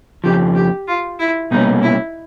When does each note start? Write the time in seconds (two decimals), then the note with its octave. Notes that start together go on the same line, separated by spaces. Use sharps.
0.24 F2 C#3 F3 G4
0.55 G4
0.88 F4
1.19 E4
1.51 C2 B2 G3 A#3 C#4 D#4
1.82 E4